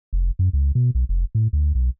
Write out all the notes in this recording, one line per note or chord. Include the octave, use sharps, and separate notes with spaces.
F1
F#2
C#2
B2
B1
F1
A2
D2
B1